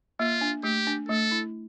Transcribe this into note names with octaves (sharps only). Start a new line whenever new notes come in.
A#3 F4
D4
A3 G4
D4
A3 A4
E4